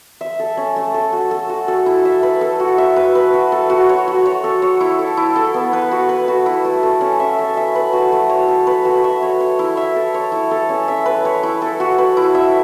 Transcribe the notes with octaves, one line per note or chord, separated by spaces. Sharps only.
E5
A4
C#4
A3
A4
F#4
A4
F#4
A4
E4
E5
B4
A4
F#4
E5
B4
B4
F#4
A4
F#4
C#5
F#4
C#5
A4
C#5
E4
A4
E4
A4
B3
B4
F#4
B4
F#4
E4
A3
A4
C#4
E5
A4
E5
B4
F#4
A3
C#5
A4
B4
F#4
E5
C#5
C#5
E4
E5
A4
C#5
E4
A4
C#4
E5
B4
C#5
E4
A4
F#4
B4
E4
E5